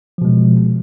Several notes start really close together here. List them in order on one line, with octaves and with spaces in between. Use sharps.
F3 B2 G#3